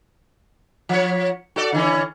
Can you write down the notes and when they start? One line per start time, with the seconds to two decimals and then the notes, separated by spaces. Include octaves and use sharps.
0.89 F3 C#5
1.56 F#4 A4 D5
1.72 D3 E3 C#4